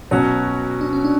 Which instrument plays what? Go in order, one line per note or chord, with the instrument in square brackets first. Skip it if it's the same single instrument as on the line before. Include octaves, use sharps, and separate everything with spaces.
[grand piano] B2 F#3 C#4 F#4 [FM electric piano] C#5
[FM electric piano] D4
C#4
D4